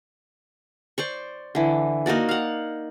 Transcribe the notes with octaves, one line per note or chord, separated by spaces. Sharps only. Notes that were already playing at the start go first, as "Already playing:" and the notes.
C5 D5 C#6
D3 E3
A#3 D#4 F#4 D5
F5 F#5